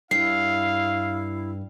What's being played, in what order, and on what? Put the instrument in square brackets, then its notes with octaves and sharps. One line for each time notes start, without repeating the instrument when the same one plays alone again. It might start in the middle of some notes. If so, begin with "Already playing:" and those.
[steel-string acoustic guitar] G2 [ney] E4 [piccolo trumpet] F5 [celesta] C7